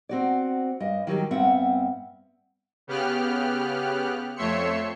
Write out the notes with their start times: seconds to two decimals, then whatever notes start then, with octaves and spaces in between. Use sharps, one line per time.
0.09 C4 F#4 D5
0.80 G2 D#5
1.07 D#3 F#3 G3 G4
1.31 G2 B3 C4 E5 F#5
2.87 C#3 B3 G4 F6 F#6
4.36 F2 A3 C#5 E5 C6 C#7